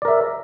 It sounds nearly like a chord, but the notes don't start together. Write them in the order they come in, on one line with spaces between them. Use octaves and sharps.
D5 A#4 E5